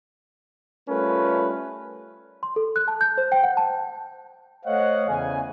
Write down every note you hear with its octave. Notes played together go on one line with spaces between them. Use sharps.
G3 A3 C#4 F4 A#4 B4
C6
A4
F#6
A5
G6
C5
G5
F#5
A5
A3 C5 C#5 D#5 F5 F#5
E2 C#3 G#5